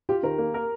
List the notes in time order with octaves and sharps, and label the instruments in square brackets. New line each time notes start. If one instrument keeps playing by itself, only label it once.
[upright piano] F4 [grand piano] G4
[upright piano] D#3 [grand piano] A#4
[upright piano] A#3
A#4